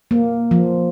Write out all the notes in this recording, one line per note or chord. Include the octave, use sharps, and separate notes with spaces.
A#3
F3